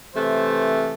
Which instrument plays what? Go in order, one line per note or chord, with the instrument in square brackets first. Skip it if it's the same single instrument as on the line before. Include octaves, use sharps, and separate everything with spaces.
[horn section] C3 E3 A3 C5